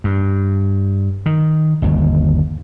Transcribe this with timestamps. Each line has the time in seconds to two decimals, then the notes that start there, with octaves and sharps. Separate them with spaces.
0.04 G2
1.26 D#3
1.82 G1 D#2